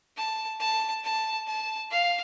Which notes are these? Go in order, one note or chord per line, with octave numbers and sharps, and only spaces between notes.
A5
A5
A5
A5
F5